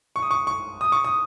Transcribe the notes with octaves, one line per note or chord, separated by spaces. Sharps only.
C#6
D#6
C#6
C#6
D#6
C#6
D#6